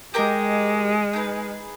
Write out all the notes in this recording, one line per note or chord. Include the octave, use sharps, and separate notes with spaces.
G#3 G4 A#4 D#5
D#4 G#4 B4